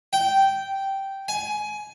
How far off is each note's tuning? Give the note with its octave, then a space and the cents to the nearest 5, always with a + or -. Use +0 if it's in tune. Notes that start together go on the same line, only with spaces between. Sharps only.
G5 -10
G#5 +20